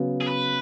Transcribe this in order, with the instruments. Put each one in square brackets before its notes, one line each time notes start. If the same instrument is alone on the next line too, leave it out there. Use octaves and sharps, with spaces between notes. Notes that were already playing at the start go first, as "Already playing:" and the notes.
Already playing: [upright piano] C#3 F#3 B3
[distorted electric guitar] G#4
B4